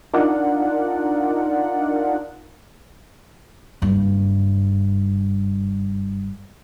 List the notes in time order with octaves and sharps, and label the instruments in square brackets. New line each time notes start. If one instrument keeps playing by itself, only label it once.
[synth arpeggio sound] D4 D#4 F4 A#4 D5 F#5
[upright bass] F#1 G2